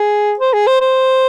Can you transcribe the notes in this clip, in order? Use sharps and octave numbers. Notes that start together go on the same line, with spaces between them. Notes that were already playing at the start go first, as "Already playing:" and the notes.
Already playing: G#4
C5
G#4
C5
C5